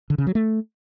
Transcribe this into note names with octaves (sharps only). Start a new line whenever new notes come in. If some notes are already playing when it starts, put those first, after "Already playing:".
D3
C#3
F#3
A3